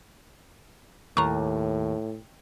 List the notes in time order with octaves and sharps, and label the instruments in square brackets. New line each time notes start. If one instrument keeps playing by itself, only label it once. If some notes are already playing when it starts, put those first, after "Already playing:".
[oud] D#2 [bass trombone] A2 [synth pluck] A#5 C#6